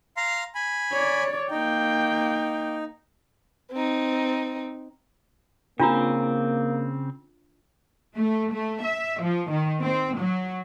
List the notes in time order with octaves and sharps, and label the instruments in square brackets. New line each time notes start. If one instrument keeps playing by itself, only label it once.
[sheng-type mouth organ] F5 A#5 C6
G#5 B5
[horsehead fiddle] C#5 D5
[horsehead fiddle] A#3 G5 [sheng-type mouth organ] D#4
[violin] C4 D#4
[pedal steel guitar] C#3 C4 [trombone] A#3 [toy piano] D4 F4 A#5
[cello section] A3
A3
E5
F3
D#3
C4
F#3